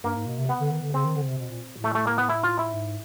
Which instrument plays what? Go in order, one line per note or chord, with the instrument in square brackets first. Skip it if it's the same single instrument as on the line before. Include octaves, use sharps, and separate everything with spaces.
[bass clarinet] G2 [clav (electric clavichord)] A#3
[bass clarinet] G#2
B2
C3
[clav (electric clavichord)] B3
[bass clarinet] D3
D#3
D3
[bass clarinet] C#3 [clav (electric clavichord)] C4
[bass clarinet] D#3
D3
C#3
C3
B2
A#2
A2
[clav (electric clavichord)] A3
A3
A#3
B3
E4
F4
E4
[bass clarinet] G#2